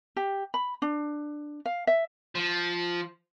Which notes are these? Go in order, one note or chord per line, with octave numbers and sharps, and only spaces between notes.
G4
B5
D4
F5
E5
F3